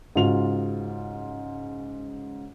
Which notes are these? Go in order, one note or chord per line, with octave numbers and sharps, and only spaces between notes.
G#2 C#3 F4 F#4 F7